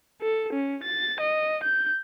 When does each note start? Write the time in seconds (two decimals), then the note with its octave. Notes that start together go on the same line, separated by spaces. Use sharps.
0.21 A4
0.53 C#4
0.84 A6
1.20 D#5
1.64 G6